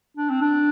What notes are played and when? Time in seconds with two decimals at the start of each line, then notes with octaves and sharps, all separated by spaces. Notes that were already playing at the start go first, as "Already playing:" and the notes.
0.17 D4
0.30 C4
0.41 D4